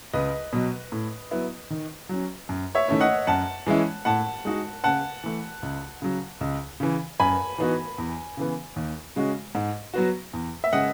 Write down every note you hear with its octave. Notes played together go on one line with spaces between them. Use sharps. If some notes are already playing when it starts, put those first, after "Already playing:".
C#2 B4 D#5
B2 F#3
A2
F#3 B3 E4
D#3
F#3 C#4
F#2
C#5 E5
D#3 A3 C#4 E4
D#5 F#5
F#2 F#5 A5
E3 G#3 C#4 E4
A2 F#5 A5
G#3 D#4 F#4
C#3 F#5 A5
E3 A3
C#2
C#3 F#3
C#2
C#3 E3
F#2 G#5 B5
E3 B3 D#4 F#4
E2
C#3 E3 B3
D#2
C#3 G#3 C#4 F#4
G#2
F#3 B3 F#4
E2
E5
C#3 G#3 D#5 F#5